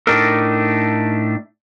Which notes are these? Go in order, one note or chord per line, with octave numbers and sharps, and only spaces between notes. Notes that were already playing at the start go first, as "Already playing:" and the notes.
A2 A3 D4 D#4 A4 A#4